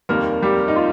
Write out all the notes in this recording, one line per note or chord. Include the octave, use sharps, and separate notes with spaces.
F1 D#2 D#3 G3 A#3 A#4
G3 G4
D#4
F4